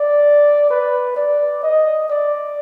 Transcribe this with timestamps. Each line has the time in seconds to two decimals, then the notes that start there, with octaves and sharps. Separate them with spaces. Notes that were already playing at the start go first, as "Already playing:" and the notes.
Already playing: D5
0.71 B4
1.17 D5
1.64 D#5
2.10 D5